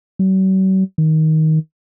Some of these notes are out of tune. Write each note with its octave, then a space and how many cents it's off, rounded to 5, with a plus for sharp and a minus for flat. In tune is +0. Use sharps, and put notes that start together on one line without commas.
F#3 +45
D#3 +15